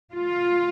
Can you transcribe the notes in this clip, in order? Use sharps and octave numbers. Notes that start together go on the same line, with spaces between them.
F4